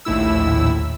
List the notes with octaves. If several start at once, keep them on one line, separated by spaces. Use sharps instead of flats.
A#1 D#2 A2 E4 E6